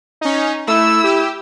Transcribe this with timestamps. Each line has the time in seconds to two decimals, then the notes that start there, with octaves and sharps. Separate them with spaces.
0.21 C#4 D#4
0.68 A3 E4 E6
1.04 G4